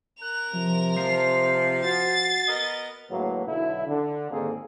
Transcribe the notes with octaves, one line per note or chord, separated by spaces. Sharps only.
A#4 F#6 F7
C3 F3
F3 C7
F#4 A6
B3 A#4 D#5
D2 A2 F#3 G#3 A#3 B4
B1 D3 E4
D3
G#1 D#2 A#3 C4 G#4 A4